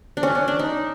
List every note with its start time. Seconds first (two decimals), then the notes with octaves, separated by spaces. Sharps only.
0.17 D4
0.23 C#4
0.35 D4
0.48 D4
0.59 D#4